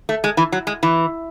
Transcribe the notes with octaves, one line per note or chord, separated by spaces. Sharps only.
A3
G#3
E3
F#3
G#3
E3